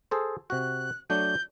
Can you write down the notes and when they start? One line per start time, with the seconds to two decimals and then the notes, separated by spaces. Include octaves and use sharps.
0.11 G#4 A4 C5
0.50 C3 F#4 F#6
1.10 F#3 A3 D4 G6